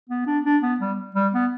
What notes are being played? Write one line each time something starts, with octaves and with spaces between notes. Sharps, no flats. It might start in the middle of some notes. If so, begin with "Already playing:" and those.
B3
D4
D4
B3
G3
G3
B3